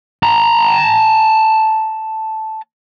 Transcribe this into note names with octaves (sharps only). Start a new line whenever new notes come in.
A5 A#5